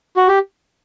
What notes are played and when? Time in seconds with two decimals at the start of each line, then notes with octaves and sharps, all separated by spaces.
0.17 F#4
0.28 G4